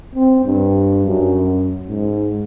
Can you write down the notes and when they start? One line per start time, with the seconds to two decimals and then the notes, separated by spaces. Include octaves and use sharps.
0.15 C4
0.45 G2
1.06 F#2
1.89 G#2